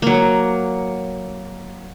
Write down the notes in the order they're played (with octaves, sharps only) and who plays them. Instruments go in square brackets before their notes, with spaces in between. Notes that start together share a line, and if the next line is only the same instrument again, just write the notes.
[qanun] F#3 A#3